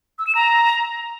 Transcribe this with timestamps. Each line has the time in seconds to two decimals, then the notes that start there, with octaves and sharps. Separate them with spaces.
0.19 E6
0.27 E7
0.35 A#5